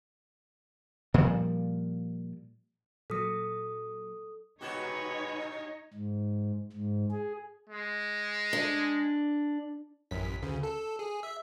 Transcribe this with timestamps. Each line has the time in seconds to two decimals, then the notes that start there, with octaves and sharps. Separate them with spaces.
1.14 A#2 F3 G3
3.10 A#2 F#3 A4 D#6
4.61 A#2 G#3 D#4 F#4 G4 B4 C#5
5.94 G#2
6.73 G#2
7.11 G#4
7.69 G#3
8.53 D4
10.11 A1 F#2 B6
10.42 D2 C#3
10.63 A4
10.99 G#4
11.23 E5